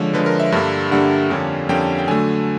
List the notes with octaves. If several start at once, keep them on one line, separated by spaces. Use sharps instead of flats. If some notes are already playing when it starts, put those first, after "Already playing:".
Already playing: D3 F3 G#3 C#5
D3 F3 G#3 B4
A#4
E5
G2 D3 G3 A#3
G2 D3 G3 A#3 F#5
F2 D3 G3 A#3 C#4
F2 D3 G3 A#3 C#4 G5
G5
D3 F#3 A3 G#5